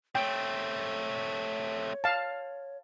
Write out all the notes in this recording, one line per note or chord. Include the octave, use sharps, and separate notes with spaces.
A3 C4 C#5 G5
F5 A5